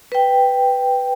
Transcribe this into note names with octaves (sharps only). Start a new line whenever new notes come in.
B4 G5